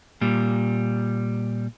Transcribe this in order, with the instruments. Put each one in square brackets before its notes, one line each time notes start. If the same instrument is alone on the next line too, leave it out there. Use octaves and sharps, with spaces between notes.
[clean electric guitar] A#2 G3